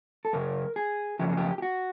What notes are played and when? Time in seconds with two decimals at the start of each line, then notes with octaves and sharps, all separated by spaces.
0.25 A4
0.33 F#2 C#3 A#4
0.76 G#4
1.19 F#2 C#3 F3 G4
1.28 G#4
1.37 G4
1.58 G4
1.62 F#4